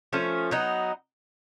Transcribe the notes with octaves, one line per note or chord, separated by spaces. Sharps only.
F3 A3 C#4
F#3 B3 D#4